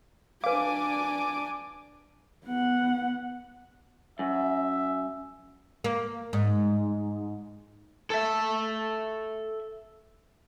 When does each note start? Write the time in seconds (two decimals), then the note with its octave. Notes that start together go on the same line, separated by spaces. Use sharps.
0.44 D4 B4 F5 G#5 D6
2.45 B3 F#5
4.19 F#2 E5
5.84 A#3
6.33 G#2
8.10 A4 E5